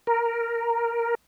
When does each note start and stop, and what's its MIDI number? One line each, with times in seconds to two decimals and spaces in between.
0.07 1.15 70